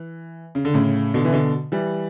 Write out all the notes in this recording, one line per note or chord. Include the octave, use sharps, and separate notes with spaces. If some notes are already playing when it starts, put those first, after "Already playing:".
Already playing: E3
C#3
D3
A2 C#3
B2 D3
E3
B2 D3
E3 G3